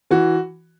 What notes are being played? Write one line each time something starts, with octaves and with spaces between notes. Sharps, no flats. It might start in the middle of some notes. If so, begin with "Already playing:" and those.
E3 F#4